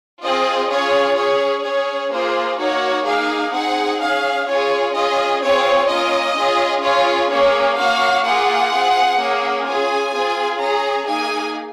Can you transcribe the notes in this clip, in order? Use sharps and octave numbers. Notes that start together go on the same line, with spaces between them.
C4 F4 G#4 D#5
C#4 F4 G#4 C#5
C#4 G#4 C#5
C#4 G#4 C#5
A#3 F4 G#4 C5
A#3 D#4 F#4 C#5
A#3 D#4 G#4 F5
C4 D#4 G#4 F#5
C#4 G#4 F5
C#4 F4 G#4 C#5
C#4 F4 G#4 D#5
C4 F4 G#4 C#5
A#3 C#4 F4 D#5
C#4 F4 G#4
C#4 F4 G#4 C#5
A#3 C#4 G#4 C#5
A#3 C#4 F#4 F5
A#3 F4 G#4 F#5
C4 F4 G#4
A#3 C#4 G#4
C#4 F4 G#4 G#5
C4 F4 G#4
C#4 G#4 A#5
A#3 D#4 G#4 G#5